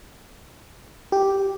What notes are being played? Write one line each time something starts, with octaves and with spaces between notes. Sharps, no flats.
G4